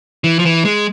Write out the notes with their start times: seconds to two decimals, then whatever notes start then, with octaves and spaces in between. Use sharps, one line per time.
0.24 E3
0.39 F3
0.45 E3
0.65 G#3